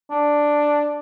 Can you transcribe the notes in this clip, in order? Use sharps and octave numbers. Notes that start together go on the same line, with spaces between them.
D4